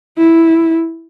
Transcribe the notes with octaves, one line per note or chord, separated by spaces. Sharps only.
E4